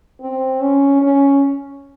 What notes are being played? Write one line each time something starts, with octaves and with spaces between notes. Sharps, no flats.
C4
C#4
C#4